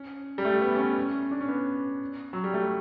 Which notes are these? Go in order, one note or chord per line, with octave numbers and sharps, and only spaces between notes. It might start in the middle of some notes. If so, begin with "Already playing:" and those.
Already playing: C#4
G3
A3
B3
C#4
B3
C#4
D4
C#4
B3
F#3
G3
A3